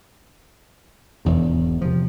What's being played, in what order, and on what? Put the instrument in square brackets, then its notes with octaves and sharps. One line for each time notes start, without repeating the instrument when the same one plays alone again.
[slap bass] E1 E2 G#2
C3 F3